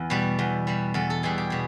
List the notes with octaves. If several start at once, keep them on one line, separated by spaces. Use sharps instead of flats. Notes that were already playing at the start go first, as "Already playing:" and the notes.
Already playing: E2
B2 G3
E2
B2 G3
E2 A4
A4
B2 G3 G#4
G4
B2 G#4